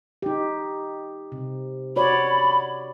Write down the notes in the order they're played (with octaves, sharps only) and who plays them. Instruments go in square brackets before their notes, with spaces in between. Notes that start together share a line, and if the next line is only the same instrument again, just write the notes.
[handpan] D#4 G4
C3
[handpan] F#4 C#5 D5 [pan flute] B5